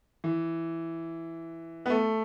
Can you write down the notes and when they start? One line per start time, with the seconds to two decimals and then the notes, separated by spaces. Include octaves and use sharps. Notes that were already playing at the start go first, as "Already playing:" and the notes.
0.24 E3
1.86 B3
1.90 A3